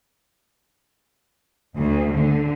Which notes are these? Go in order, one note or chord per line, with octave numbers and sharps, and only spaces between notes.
D2
D3